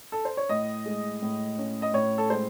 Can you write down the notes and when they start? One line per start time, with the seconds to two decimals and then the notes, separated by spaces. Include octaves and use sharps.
0.12 A4
0.25 C5
0.37 C#5
0.49 A2 D#5
0.85 G#3
1.22 A2
1.58 C#4
1.82 D#5
1.94 A2 C#5
2.18 A4
2.30 G#3 C5